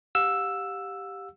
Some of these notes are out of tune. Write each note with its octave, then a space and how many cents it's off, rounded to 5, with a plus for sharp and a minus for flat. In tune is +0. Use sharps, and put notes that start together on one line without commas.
G4 +0 F5 +45 E6 +5